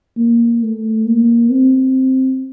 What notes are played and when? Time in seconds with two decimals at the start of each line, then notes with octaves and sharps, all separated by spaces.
0.18 A#3
0.63 A3
1.06 A#3
1.50 C4